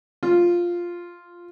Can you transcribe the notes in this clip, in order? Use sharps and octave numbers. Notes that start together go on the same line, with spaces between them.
F4